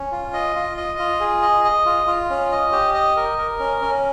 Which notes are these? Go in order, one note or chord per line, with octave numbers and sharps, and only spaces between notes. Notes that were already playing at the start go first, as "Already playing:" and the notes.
Already playing: C#4
F4
D#5
F4
D#5
F4
G#4
D#5
D#5
F4
F4
C#4
D#5
G4
D#5
A#4
A#4
C#4
C#4